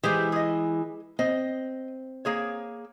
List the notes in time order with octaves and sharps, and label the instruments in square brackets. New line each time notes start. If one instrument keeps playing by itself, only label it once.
[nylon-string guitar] E3 G#3 [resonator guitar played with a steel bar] G4 G#4 C5
[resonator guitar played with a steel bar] G#4 D#5
[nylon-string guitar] C4 [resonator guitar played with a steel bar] D#5
[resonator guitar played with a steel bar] A#3 G#4 C#5